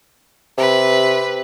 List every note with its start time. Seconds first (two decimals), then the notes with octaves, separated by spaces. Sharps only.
0.58 C3 B4